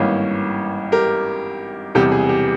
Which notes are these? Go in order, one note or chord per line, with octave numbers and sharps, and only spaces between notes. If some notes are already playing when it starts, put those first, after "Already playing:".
Already playing: G#1 G2 E3 A#3 C#4
G4 A#4
E1 E2 C3 G3 G4
G#4
G4